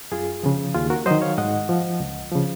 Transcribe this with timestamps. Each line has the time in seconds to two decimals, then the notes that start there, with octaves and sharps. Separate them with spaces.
0.12 F#2 F4 G#4
0.43 C#3 F3
0.74 D#2 F4 G#4
0.90 F#4 A#4
1.06 D#3 F#3 C5 D#5
1.22 C#5 F5
1.38 G#2 D#5 F#5
1.69 F3
2.00 C#2
2.32 C#3 F3